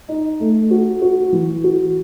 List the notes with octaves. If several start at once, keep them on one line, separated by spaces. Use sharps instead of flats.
D#4
A3
F#4
F#4
E3
F#4